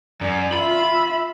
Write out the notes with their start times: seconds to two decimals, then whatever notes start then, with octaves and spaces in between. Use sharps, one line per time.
0.21 F#2 D5
0.54 F4 E5 B5